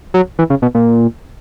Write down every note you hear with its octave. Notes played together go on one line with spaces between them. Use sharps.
F#3
E3
C#3
B2
A#2